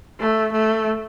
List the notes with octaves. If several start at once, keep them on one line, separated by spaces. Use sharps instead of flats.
A3
A3